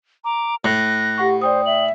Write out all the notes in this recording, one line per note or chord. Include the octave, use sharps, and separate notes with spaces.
A#5 D6
A2 F#6 A#6
G4 F#5 C#6
C5 D5 G5 D#6
E5 F#7